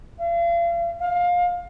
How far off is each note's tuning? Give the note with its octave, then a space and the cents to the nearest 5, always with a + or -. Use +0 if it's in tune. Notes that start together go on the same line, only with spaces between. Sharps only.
F5 -40
F5 +20